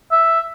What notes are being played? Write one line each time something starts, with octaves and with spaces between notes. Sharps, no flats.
E5